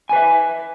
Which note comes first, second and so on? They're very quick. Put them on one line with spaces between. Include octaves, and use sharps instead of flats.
G#5 B4 E5